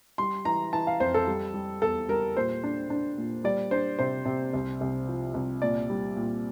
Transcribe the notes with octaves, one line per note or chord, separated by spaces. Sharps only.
G3 C6
E3 A#5
E3 A5
F5
F2 C5
A4
G3
G3
E2 A4
G3 A#4
A#2 C5
D4
D4
A#2
G3 D5
D4 C5
C3 C5
C3
C2
C2
F3
C2
A#2 D5
G3
A#2